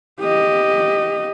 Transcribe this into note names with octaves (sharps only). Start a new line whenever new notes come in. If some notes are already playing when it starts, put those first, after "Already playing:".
G4 D#5